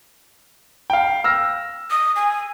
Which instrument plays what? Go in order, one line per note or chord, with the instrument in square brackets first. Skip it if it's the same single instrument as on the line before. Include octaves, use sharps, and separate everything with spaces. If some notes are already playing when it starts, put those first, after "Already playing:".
[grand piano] F5 G5
E6 F6 A#6
[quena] D#6
G#5